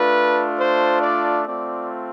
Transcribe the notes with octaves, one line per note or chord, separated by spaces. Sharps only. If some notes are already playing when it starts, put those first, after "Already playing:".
Already playing: A3 D4 F4 B4
C5
D5
A3 C4 F4 D5